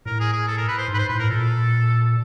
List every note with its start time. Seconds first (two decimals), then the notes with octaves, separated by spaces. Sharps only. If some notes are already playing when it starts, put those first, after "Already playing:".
0.06 A2 A#4
0.20 G#4
0.33 G#4
0.48 A4
0.58 A#4
0.68 B4
0.78 C5
0.88 G#2
0.94 B4
0.99 C5
1.08 A2 B4
1.19 A#4
1.30 A#2 A4